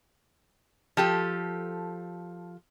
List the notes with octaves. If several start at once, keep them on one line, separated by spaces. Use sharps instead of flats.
F3 G4 A4